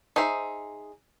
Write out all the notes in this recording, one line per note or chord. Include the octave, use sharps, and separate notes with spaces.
D#4 G#4 C5 E5